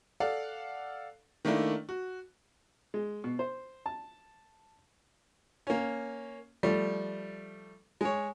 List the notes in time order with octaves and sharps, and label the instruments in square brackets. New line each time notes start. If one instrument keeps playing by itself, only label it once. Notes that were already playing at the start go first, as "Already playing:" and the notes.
[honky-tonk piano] A4 D5 F5 F#5
D#3 A3 A#3 D4 E4
F#4
[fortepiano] G#3
B2
C5
A5
A#3 C#4
F3 G3 A3
G#3 C#5